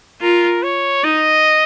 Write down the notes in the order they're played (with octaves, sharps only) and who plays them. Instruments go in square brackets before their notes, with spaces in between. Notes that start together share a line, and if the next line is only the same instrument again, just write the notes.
[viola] F4 [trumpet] A#4
[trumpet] C#5
[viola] D#4 [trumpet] D#5